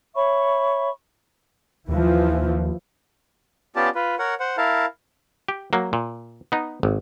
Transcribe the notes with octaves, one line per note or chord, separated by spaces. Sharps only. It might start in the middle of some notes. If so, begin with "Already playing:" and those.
C#5 E5 B5 C#6
D#2 E3 F3
B3 C#4 F4 G4 D5 A5
F4 B4
A#4 C#5 F#5
C5 F#5
E4 A#4 F5 A5
G4
F#3 A#3
A#2
B3 D#4
G#1